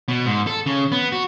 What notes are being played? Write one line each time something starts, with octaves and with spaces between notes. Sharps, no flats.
B2
G#2
A4
C#3
B3
F#4